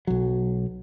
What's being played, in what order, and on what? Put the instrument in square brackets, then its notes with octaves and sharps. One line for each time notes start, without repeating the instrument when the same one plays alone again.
[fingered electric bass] B1 F#3